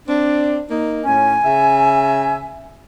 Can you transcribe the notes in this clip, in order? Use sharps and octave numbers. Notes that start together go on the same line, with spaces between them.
C4 D4
A#3 D#4
A2 C#4 G#5
C#3 E5